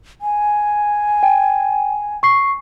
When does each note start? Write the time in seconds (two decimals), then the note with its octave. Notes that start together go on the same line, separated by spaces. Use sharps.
0.21 G#5
1.23 G5
2.23 C#6 C7